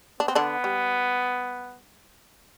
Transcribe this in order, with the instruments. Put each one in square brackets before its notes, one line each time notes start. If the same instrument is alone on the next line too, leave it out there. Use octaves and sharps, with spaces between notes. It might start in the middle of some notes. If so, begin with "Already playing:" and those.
[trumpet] B3 [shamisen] D4
[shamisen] C4
D3 D4
G3